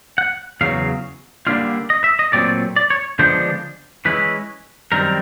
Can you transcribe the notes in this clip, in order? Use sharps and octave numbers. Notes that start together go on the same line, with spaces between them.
F#5
E2 C#3 F#3 F5
D3 G3 A#3 D4 F4 F5
D#5
E5
D#5
A#2 F#3 A3 C4 D5
D5
C#5
D3 F3 G#3 B3 D4 C5
E3 G#3 C#4 E4 B4
F#2 D#3 G3 C4 A#4